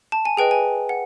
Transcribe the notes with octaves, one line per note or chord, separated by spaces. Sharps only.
A5
G#5
G#4 B4 D#5 G5
G#5
F#5